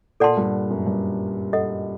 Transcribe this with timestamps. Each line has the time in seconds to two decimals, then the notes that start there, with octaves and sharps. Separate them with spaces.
0.20 A#2 A4 D5 F#5 A5 C6
0.37 G2
0.70 F#2
0.87 G2
1.53 A4 D#5 F#5